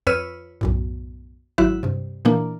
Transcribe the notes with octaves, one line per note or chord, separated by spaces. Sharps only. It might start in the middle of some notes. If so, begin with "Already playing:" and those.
F2 B4 C#5 E6 F6 D#7
B1 F#2 A2
G#1 F#3 E4 F#4 E5 F#6
G2 C3
A#2 E3 A#3 D4